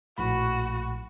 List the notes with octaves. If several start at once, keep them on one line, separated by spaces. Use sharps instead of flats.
A#1 A2 F#4 B5